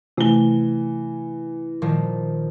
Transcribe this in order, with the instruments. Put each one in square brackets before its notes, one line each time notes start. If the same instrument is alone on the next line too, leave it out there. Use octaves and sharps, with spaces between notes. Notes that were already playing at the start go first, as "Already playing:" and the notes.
[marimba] C3 A3 [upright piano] E3 G7
[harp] A#2 D#3 F3